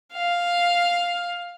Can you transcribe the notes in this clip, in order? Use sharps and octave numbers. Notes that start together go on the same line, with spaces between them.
F5